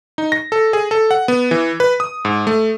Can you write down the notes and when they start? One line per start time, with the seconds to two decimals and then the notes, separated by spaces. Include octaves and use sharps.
0.18 D#4
0.32 A#6
0.52 A4
0.73 G#4
0.91 A4
1.11 F#5
1.28 B3
1.51 E3
1.80 B4
2.00 D#6
2.25 G#2
2.47 A3